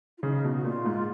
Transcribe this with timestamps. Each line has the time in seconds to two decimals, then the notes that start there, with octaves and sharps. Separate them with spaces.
0.18 F4
0.22 C#3 D#4
0.44 B2
0.56 F#4
0.64 A#2 F4
0.86 G#2